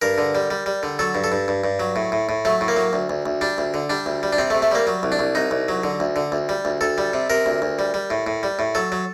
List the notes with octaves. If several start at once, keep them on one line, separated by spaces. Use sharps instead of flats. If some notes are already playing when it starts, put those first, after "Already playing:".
G2 A#4
D3
G3
G3
G3
D3
F#3 A4
G2
A4
G2
G2
G2
F#3
A2
A2
A2
F#3 A3
A2
A#3
F#3
D2
D2
D2
G3 D4
D2
D3
G3 D4
D2
G3
D4
C3 C4
A3
C3
A3
G3 A#3
F#3
C2
D4
C2
C2 D#4
C2
F#3
D3
D2
D3
D2
G3
D2
D2 A4
G3
C3
C3 A#4
D2
D2
G3
G3
A2
A2
G3
A2
F#3 A4
F#3